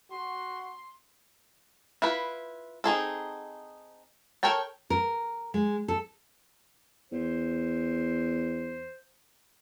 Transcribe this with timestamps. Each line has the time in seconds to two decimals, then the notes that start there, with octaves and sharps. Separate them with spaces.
0.11 F#4 C6
2.02 E4 F4 B4
2.84 C4 D#4 G#4 A4
4.43 A4 A#4 C#5 G5 A5
4.90 A#4
5.54 G#3
5.88 A4
7.12 E2 C5